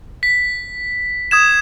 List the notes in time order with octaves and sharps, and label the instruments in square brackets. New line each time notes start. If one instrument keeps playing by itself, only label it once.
[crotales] B6
D#6 G#6 E7